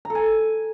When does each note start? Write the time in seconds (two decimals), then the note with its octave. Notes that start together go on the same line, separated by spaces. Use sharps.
0.05 A#5
0.10 A4
0.15 G#5